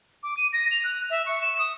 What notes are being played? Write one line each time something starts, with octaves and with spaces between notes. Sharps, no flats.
D6
D#7
A#6
F7
F#6
E5
C#6
E7
D#6